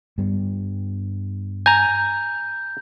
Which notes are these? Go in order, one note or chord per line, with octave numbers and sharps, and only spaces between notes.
G2 G3 B3
G#5 A#5 G6